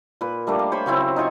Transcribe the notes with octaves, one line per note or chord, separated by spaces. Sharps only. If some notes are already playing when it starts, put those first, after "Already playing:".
A#2 B4
G3 A3 A#3 D4
F5
C5 C#5 G#5 B5
C#3 F#3 C4 E4
D#4 F4 G#5 C#6